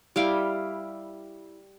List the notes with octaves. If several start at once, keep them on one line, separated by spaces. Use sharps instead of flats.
G3 E4 F5 G5